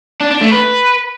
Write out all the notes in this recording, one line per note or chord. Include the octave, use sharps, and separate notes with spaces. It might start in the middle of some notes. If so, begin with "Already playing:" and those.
D4
D4
A3
B4